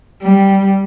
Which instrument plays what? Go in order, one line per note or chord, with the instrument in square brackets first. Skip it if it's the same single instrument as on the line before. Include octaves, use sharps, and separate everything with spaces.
[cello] G3